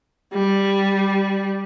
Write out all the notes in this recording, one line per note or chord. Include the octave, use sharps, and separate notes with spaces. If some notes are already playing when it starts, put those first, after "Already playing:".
G3